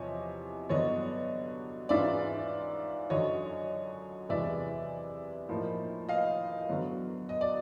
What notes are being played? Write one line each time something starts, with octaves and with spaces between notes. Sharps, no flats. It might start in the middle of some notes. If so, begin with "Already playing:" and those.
Already playing: E2 C3 F3 C#5 D#5
G2 D3 F#3 B3 D4 C#5 D#5
G#2 E3 G#3 C#4 F4 D5 E5
F#2 D3 F#3 C#5 D#5
E2 C3 E3 G#3 D5 E5
A2 F3 A#3 D#4
D#5 F5
D3 F#3 B3
D#5
D5